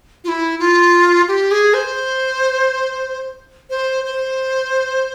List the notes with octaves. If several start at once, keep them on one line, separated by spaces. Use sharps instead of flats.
F4
E4
F4
G4
G#4
C5
C5
C5